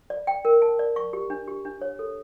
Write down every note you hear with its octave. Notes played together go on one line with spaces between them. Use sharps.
D5
G5
A#4
A5
D5
C#6
G4
D4
G4
D4
C#5
A4